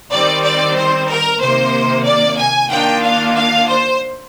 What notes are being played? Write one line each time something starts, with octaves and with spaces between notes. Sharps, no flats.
D#3 G3 C4 D5
D5
C5
A#4
C3 D#3 A#3 C5
D5
G#5
D#3 A#3 D4 F4 G5
F5
F5
C5